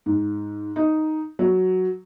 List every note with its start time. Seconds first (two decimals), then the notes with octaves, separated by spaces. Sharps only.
0.06 G#2
0.76 D#4
1.39 F#3